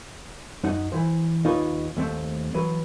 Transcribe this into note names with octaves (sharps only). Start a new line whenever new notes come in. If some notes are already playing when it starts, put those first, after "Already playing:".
F#2 D#4 F#5
E3 C5
D#2 D#4 F4 B4 C#5
D#2 A3 C4
E3 F#3 B4